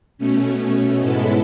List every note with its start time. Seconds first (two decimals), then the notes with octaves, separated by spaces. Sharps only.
0.18 B2 A3 C#4
1.00 G#2 G#3 B3 E4 A4